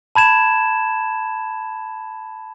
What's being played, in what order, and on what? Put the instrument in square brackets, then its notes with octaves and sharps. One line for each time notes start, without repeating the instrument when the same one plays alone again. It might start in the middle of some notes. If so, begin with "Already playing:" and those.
[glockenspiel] A5 B5 G#6 E7